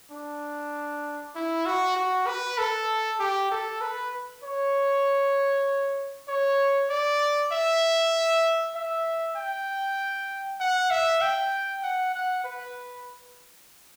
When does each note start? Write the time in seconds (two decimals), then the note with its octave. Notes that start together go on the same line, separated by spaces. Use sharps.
0.11 D4
1.36 E4
1.66 F#4
1.96 F#4
2.27 B4
2.58 A4
3.20 G4
3.51 A4
3.82 B4
4.44 C#5
6.28 C#5
6.90 D5
7.52 E5
8.75 E5
9.37 G5
10.60 F#5
10.91 E5
11.21 G5
11.83 F#5
12.15 F#5
12.44 B4